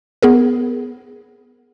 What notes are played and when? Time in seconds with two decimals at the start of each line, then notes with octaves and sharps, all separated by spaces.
0.23 B3 G#4 A#4